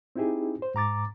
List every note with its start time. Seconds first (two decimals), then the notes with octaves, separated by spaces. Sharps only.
0.16 C4 D#4 E4 G4 G#4
0.62 C5
0.74 G#2 A#5 D6 A6